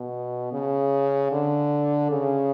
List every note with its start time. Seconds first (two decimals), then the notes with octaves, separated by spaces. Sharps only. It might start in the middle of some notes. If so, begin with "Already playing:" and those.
Already playing: B2
0.53 C#3
1.32 D3
2.11 C#3